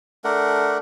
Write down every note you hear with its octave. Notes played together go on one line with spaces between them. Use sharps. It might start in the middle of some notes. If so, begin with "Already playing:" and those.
A3 D4 A#4 F#5